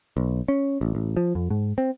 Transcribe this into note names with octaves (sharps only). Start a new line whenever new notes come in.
B1
C#4
A1
A1
F3
F2
G#2
C4